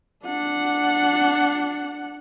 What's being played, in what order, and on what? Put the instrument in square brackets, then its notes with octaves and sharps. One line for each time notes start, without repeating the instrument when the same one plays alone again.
[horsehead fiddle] D4 F#5